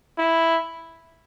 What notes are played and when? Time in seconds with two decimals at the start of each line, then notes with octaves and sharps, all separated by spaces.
0.18 E4